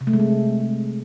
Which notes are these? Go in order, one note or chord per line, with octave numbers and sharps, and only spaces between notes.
C3
A3
G#3
C4